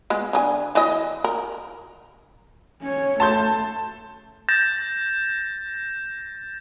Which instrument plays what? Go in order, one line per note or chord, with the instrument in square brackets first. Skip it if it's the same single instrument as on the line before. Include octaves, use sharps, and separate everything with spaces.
[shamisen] G#3 B3
D3 D#4 G#5
E3 D#5
A#4
[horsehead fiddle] C#4 C#5
[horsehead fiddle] A3 [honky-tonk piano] A5 C6 G6
[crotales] G6 A6 A#6 E7